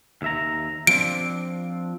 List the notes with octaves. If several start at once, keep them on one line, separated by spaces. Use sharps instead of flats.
D#2 E5 A#5
F3 C4 D4 D7